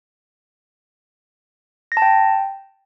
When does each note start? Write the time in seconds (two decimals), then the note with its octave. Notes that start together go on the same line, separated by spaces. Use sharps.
1.92 A#6
1.97 A5
2.02 G5